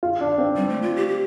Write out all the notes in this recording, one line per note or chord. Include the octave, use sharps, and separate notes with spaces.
F4
D4
C4
G3
A3
F4
G4
G4